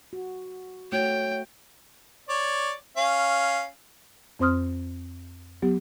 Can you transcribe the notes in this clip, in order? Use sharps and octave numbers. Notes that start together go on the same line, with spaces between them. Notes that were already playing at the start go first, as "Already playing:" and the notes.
F#4
A3 F#4 C#5 G5
C#5 D5
C#4 F5
F2 C4 C5 C6 D#6 F6
F#3 B3 G4